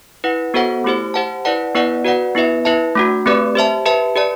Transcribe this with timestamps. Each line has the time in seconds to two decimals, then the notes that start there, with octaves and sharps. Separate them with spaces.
0.24 E4 B4 F#5
0.54 B3 F#4 A4 C5 F#5
0.84 A3 E4 G4 C5
1.14 G4 C5 F#5 A5
1.45 E4 B4 D5 F#5 A5
1.75 B3 E4 B4 D5 F#5
2.05 F#4 B4 D5 F#5
2.35 B3 E4 B4 E5
2.65 E4 B4 E5 A5
2.95 A3 D4 F#4
3.26 A3 C4 G4 B4 D5
3.55 G4 C5 E5 A5
3.86 G4 B4 E5 A5
4.16 G4 B4 D5 A5